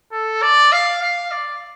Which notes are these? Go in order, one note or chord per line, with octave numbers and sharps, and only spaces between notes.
A4
D5
F5
F5
D5